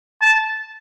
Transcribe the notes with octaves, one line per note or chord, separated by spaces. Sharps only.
A5